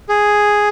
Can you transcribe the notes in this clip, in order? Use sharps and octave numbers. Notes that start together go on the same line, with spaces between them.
G#4